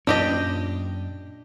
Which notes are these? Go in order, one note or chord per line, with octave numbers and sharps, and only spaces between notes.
F#2 A#2 C#4 D4 G4 D#5